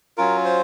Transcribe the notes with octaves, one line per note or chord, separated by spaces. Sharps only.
F#3 C#4 F4 A#4
C5